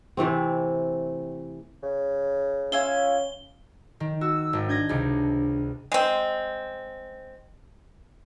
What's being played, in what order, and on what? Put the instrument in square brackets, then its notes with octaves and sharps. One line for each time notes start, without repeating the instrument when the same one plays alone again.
[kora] C3 E3 A3 C4
[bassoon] C#3
[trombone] C#4 [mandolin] F4 E5 G#5 [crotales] G7
[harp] D#3
[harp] F#4 [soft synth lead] E6
[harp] G#1
[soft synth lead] D4 [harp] G6 G#6 A#6
[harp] C#2 C3 C#7
[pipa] G#3 C4